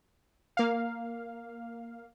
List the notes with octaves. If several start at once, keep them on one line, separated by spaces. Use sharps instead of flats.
A#3 F5